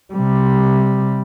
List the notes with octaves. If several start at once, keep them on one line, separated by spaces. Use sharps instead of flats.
C3 G3